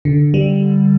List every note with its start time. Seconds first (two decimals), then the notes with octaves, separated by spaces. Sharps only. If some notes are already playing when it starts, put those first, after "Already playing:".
0.05 D3
0.34 G3